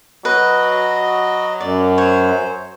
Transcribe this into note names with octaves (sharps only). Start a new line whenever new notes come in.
F#3 F#4 B4 D#5
F#2 D5
C5 C#5